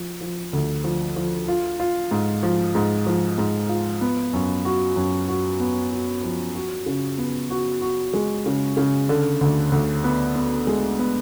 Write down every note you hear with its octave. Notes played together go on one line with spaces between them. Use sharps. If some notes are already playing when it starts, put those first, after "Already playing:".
Already playing: F3
F3
D2
F3
F3
F4
F4
G#2
F3
G#2
F3
G#2
F4
B3
F#2
F#4
F#2
F#4
B3
F#4
F3
F#4
C#3
B3
F#4
F#4
G#3
C#3
C#3
D3
D2
D2
B3
B3
G#3
B3